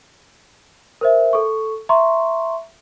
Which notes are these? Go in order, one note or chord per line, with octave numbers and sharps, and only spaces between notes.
A#4 C5 E5
A4 C#6
E5 A#5 C6 C#6